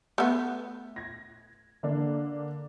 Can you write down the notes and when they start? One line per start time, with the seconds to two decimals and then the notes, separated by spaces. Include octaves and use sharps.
0.18 A3 B3
0.96 G#6 A#6
1.83 D3 A#3 D4